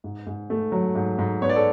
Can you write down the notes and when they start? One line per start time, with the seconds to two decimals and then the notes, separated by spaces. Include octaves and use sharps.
0.04 G#2
0.27 G#2
0.50 A3
0.72 F#3
0.95 G#2
1.19 G#2
1.42 B3 C#5
1.49 D5
1.56 A4 C#5